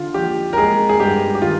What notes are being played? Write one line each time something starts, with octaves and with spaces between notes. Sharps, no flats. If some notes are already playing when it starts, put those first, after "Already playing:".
Already playing: D3 F4
F3 G4
A#4
G#3 G#4
G#4
G2 G4
G4
D#3 F4